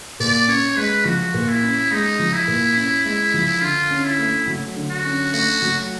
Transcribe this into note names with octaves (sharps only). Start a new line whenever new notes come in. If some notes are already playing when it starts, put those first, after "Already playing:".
A#2 D5
C#4 C#5
G#3 B4
F3 F#4
A#2
E4
C#4
G#3 D#4
F3
E4
A#2
C#4
G#3
F3
D3 F4
C#4
E4
A3
F#3
D3
F#4
C#4
A3 F#4
F#3